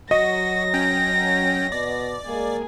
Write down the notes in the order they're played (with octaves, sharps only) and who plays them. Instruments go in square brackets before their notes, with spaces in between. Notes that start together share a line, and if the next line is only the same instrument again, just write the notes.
[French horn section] F#3 [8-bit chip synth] F#4 [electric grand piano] D#5 [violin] A#6
[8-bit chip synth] C#4 G5
[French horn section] B2 B3 [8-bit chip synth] D5
[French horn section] G#3 A#3 [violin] G#4